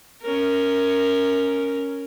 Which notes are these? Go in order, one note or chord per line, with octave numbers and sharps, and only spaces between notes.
C#4 A#4